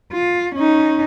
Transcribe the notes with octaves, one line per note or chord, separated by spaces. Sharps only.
F4
C#4 D#4